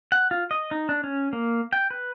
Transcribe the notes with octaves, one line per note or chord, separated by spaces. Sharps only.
F#5
F4
D#5
D#4
D4
C#4
A#3
G5
B4